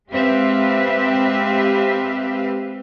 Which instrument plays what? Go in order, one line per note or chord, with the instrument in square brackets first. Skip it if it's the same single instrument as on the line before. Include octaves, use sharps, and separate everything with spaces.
[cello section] G#3 C4 G4 B4 E5 F5